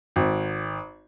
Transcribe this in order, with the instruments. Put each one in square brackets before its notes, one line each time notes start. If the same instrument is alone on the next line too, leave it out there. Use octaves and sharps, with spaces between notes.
[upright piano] G#1